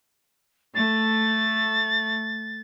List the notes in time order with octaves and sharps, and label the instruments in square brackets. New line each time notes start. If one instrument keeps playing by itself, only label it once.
[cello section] A3 [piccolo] A6